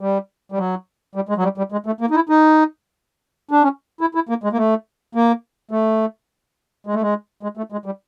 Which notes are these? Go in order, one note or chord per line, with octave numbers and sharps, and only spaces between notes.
G3
G3
F#3
G3
G#3
F#3
G3
G3
G#3
A3
A#3
D#4
E4
D#4
D4
C#4
E4
E4
A#3
G#3
A#3
A3
A#3
A3
G#3
A3
G#3
G#3
A3
G#3
G3